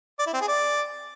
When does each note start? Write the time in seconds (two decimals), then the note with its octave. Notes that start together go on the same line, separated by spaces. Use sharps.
0.19 D5
0.27 E4
0.34 C4
0.41 G#4
0.48 D5